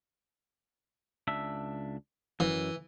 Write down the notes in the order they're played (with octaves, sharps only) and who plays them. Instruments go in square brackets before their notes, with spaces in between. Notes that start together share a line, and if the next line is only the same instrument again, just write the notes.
[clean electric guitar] C#2 D4 E5
[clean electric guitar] F#2 [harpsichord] E3